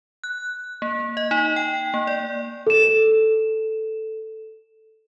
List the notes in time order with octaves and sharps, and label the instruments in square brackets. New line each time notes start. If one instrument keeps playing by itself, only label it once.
[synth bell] F#6
A#3
D#5
D#4
G5
A#3
D5
[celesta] A4 E7